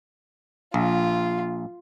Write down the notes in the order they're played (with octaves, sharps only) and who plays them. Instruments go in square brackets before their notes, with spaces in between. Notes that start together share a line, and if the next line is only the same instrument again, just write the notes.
[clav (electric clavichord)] A#1 [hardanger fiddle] F4